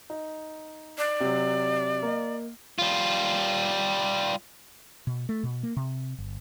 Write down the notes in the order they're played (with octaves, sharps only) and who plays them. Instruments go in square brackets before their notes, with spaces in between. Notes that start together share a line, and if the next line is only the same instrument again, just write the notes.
[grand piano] D#4
[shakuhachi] D5
[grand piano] C3 F#3
A#3 D#5
[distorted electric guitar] G3 F4
[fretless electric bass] B2
A3
B2
A#3
C3
G1